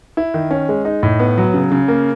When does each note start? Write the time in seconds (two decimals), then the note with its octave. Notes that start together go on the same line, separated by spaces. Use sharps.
0.17 E4
0.34 D#3
0.51 C#4
0.69 G#3
0.85 D#4
1.03 A2
1.20 B3
1.38 F#3
1.54 C#3
1.72 C#3
1.88 A#3